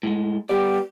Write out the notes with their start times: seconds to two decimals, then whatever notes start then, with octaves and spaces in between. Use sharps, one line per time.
0.03 A2 G#3
0.49 G3 B3 G4 D5